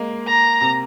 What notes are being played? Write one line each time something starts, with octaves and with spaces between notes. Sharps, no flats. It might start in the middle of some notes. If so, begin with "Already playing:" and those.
Already playing: G#3 A#3
A#5
C3